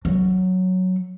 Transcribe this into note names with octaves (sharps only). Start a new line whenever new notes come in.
F#3